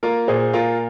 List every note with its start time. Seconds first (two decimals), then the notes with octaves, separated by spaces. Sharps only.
0.03 A#3 F4 A#4
0.28 A#2 G#4 C5
0.53 A#2 F4 A#4